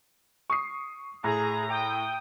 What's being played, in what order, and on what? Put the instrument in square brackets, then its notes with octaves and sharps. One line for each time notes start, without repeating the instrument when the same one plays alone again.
[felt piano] C#6 D#6 C7
[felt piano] A2 [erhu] G#4 [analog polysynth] A#5
[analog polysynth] G5 [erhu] D#6